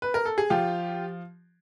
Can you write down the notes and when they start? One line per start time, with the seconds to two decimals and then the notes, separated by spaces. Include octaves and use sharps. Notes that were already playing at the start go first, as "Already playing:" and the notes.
0.02 B4
0.14 A#4
0.25 A4
0.38 G#4
0.50 F3 F4 G4